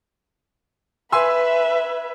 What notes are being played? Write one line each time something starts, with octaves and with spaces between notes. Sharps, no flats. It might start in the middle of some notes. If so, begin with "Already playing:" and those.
B4 E5 G#5 C6 E6